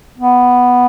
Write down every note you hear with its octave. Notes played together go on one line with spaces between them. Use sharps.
B3